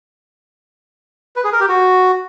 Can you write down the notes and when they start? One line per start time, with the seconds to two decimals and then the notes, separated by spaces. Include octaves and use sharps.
1.36 B4
1.44 G#4
1.52 A#4
1.61 G4
1.69 F#4